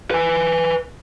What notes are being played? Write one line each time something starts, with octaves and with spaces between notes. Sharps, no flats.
B4 G#5